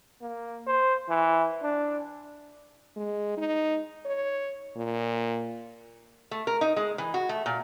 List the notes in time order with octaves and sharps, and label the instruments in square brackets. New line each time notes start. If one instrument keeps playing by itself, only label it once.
[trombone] A#3
C5
E3
D4
[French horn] G#3
D#4
C#5
A#2
[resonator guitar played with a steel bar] A3
A#4
D#4
G#3
E3
F#4
A3
A#2